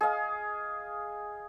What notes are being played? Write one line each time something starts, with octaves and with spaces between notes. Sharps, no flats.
G#4 D#5 F5